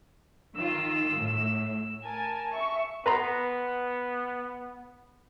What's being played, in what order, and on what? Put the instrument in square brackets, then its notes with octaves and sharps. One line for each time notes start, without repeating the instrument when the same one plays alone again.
[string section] D#3 F4 [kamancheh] E6
[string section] A2
[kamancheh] A#4 [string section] G#5 A5
[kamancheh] E5 [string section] C#6
[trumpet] B3 [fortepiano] B4 A#5 C6